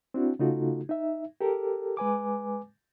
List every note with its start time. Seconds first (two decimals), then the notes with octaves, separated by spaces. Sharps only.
0.14 C4 D4 E4 F#4
0.39 C#3 A3 D#4 F4 F#4 A4
0.89 D#4 E5
1.41 G4 A4 A#4
1.97 G#3 B4 G#5 D6